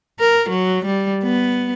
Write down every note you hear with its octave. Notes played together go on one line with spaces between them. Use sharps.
A#4
F#3
G3
B3